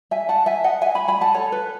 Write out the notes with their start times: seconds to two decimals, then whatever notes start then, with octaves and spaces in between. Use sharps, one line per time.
0.11 E5 G#5
0.29 F#5 A5
0.46 E5 G#5
0.64 D#5 F#5
0.82 E5 G#5
0.95 G#5 B5
1.08 G#5 B5
1.21 F#5 A5
1.34 A4 C#5
1.52 B4